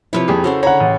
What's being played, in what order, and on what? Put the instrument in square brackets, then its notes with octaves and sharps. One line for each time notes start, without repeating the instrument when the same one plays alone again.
[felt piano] C3 F3 [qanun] E4 B4 C#5
[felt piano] F2 G4 G#4
[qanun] C#3 C#4 C5 [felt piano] F#4 A4
[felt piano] D3 A#5 [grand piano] C#5 F#5 [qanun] B5
[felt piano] A1